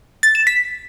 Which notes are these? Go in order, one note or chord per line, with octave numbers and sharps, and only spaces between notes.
A6
E7
B6